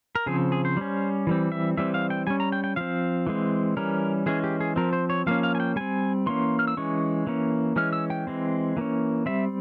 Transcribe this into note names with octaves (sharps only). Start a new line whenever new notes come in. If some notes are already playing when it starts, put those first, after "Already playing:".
A#4
C#3 F3 C4 G#4
G#4
C5
G3 C#4
E3 G3 C4
E5
E3 G3 C4 E5
F5
G5
G3 C#4 G#5
A#5
G5
G5
F3 C4 F5
E3 G#3 C4
E3 G3 C#4 A#4
E3 G#3 C#4 G#4
G4
G#4
F3 C4 A#4
C5
C#5
F3 A#3 C#4 F5
F5
G#5
G5
G3 C4 G#5
E3 A#3 C#4 C6
F6
E6
E3 G#3 C#4 C#6
E3 A#3 C#4
E3 G#3 C#4 F6
E6
G5
E3 G#3 C4
E3 A#3 C#4
G3 C4 E5